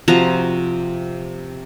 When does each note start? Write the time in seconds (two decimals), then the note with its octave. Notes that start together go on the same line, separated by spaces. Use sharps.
0.08 C3 F3 F#4 A#5